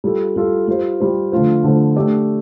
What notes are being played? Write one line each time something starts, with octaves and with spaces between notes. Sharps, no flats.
G3 F4 A4
G3 F4 A4
G3 F4 C5
G3 F4 C5
D3 F3 A3 F4 C5
D3 F3 A3 F4 C5
A3 D4 G4 D5